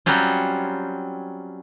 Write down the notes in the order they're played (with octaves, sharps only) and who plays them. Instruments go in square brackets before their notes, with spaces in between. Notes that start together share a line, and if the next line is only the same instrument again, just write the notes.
[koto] F#3 G3 C4 C#4 F4